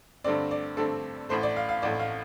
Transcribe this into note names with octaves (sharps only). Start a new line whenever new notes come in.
G2 D3 A3 C4 D5
D5
G2 D3 A3 C4 A4
A1 A2 A3 C5
D5
F5
F5
A1 A2 A3 D5
F5